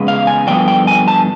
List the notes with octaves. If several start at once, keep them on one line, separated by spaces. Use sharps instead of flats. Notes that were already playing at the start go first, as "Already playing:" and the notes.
Already playing: E2 C#3 G#3 B3
F5
G#5
G2 D3 F3 B3 G5
G5
G#5
A5